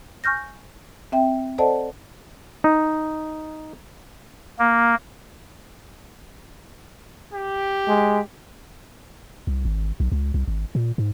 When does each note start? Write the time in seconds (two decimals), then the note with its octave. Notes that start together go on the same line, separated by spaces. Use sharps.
0.24 G#5 C#6 F6 G6 A#6
1.12 C4 E5 G5
1.58 A4 C5 D5 D#5 F#5 A5
2.64 D#4
4.59 A#3
7.34 G4
7.88 G#3
9.47 C2
9.65 G#1
10.00 B1
10.12 C#2
10.34 C2
10.47 G#1
10.75 A#2
10.98 G#2